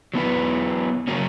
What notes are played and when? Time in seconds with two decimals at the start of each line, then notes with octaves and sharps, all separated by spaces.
0.14 F#3 B3 E4 B4
1.08 C#3 F#3 A#3 C#4